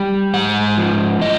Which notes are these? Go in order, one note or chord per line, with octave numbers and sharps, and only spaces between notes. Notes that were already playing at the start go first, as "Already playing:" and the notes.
Already playing: G3 G5
G#2 F#5
F3
A2 D#5